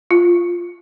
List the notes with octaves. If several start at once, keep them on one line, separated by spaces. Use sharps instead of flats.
F4